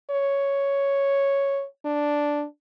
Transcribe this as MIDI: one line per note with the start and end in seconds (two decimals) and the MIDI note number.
0.11 1.65 73
1.85 2.44 62